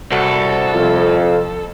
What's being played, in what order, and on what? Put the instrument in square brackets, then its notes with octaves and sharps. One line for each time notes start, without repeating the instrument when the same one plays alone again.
[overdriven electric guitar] C2 [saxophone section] F#4 [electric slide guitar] A4
[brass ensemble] F2 [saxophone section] F4